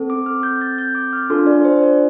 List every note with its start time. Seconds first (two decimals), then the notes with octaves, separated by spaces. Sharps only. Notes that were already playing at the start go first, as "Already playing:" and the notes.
Already playing: C4 A4
0.10 D6
0.26 F6
0.43 G6
0.61 A6
0.78 G6
0.95 D6
1.13 F6
1.30 D4 F4 A4 C6
1.47 D5
1.65 C5
1.82 D5